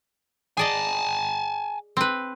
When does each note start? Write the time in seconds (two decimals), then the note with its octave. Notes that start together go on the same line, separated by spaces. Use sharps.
0.57 G#4 D5 D#5 G#5 A5
1.97 C4 B4